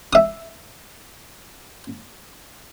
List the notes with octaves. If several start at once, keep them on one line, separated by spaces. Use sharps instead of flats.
E5 D#6